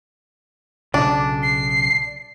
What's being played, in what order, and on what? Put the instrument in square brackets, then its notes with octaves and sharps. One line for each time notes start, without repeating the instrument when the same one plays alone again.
[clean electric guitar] B1 C#3 [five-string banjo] D4
[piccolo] C7